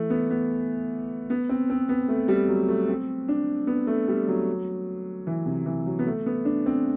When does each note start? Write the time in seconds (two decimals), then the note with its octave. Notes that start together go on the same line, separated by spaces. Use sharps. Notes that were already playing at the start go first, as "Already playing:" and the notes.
Already playing: E3 A3
0.10 B3
0.30 B3
1.30 B3
1.49 C4
1.70 C4
1.89 B3
2.08 A3
2.28 G3
2.48 F#3
2.69 A3
2.89 C4
3.28 D4
3.67 B3
3.87 A3
4.08 G3
4.28 F#3
5.27 E3
5.46 C3
5.66 E3
5.86 F#3
5.99 B3
6.07 A3
6.26 B3
6.45 D4
6.66 C4